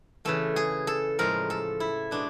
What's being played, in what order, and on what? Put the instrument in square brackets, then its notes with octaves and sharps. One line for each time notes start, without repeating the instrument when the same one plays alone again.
[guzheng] C#3 E3 A3 A4
G#4
A4
A2 F3 G#3 A#4
A4
E4
B2 G#3 D4